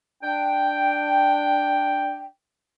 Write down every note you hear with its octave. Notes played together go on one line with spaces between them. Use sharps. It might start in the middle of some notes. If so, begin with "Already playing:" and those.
D4 G5